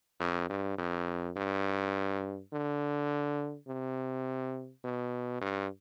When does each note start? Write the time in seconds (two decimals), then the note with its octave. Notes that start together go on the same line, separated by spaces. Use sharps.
0.20 F2
0.50 G2
0.78 F2
1.36 G2
2.52 D3
3.67 C3
4.84 B2
5.41 G2